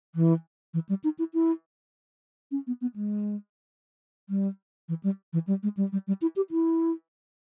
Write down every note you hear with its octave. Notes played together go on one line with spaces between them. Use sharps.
E3
E3
G3
D#4
E4
E4
C#4
B3
B3
G#3
G3
E3
G3
E3
G3
G#3
G3
G3
G3
E4
G4
E4